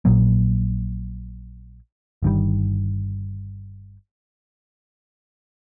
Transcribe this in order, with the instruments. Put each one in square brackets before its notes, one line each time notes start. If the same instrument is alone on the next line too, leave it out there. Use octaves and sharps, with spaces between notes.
[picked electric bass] A#1 A#2 F#3 A#3
G1 G2 D#3 G3